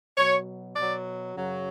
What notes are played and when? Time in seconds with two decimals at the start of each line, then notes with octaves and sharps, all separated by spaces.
0.17 B2 F#3 C#5
0.76 B2 F#3 D5
1.35 F#2 C#3 F#3